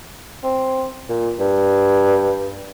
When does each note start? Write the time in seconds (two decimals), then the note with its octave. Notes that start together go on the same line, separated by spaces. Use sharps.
0.44 C4
1.09 A#2
1.40 G2